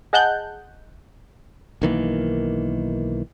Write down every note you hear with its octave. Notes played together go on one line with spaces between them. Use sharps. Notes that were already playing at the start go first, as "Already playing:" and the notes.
G#4 D#5 F#5 A5 F#6 G6
B1 D#3 E3 A#3